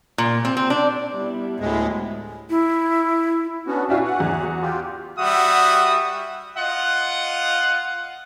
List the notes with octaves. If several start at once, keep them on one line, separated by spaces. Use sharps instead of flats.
A#2
C4
C4
D4
G3 B3 E4
D2 A2 G#3
E4
B3 C#4 D4 F#4
D4 E4 F#4 E5 F5 G#5
F#5
E2
F#4
F4 G4
G3 F#4 E5 F#5 D#6
F4 D#5 F#5